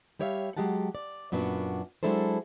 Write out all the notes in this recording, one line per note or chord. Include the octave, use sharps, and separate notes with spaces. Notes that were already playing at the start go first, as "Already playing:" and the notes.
G3 G4 C#5 D5 E5 F5
F#3 G#3 G4 F#5 A5
D5
F#2 A#2 B3 D4 F#4
F#3 G#3 D4 E4 A4 C5